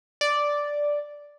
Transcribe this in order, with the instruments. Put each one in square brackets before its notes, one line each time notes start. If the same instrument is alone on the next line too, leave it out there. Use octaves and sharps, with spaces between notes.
[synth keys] D5